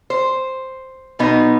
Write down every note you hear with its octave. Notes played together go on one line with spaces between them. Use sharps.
C5
B2 B3 D#4